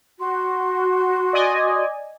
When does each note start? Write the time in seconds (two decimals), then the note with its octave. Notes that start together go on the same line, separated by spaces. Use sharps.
0.19 F#4 C6
1.33 D5 D#5 G#5